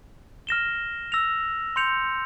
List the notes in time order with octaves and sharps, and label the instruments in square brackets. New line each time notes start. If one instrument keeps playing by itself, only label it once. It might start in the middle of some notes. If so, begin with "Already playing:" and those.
[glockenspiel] F6 A#6 E7 G7
E6 A#6 F7
C6 G6 C#7 F7